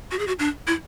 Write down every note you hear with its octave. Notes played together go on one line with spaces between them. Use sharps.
F#4
G#4
F#4
D4
E4